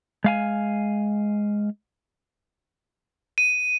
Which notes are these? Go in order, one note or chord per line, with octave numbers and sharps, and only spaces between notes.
G#3 F5 G#5
D#7